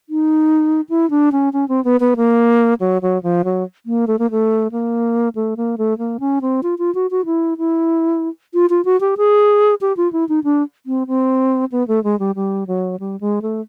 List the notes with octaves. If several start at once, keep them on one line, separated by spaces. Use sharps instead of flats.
D#4
E4
D4
C#4
C#4
C4
B3
B3
A#3
F#3
F#3
F3
F#3
A#3
A3
A#3
A3
A#3
A3
A#3
A3
A#3
C#4
C4
F4
F4
F#4
F#4
E4
E4
F4
F4
F#4
G4
G#4
G4
F4
E4
D#4
D4
C4
C4
B3
A3
G#3
G3
G3
F#3
G3
G#3
A3